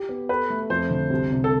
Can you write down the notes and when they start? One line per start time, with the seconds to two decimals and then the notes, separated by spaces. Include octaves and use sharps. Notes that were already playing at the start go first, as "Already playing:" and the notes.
Already playing: G4
0.09 B3
0.29 A4 B4
0.50 A3
0.70 F2 C5
0.90 D3
1.10 C2
1.31 C3
1.44 A4